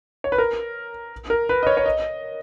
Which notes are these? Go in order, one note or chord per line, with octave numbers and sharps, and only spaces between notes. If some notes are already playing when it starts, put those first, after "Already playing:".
C#5
B4
A#4
A#4
B4
D#5
C#5
C#5
D#5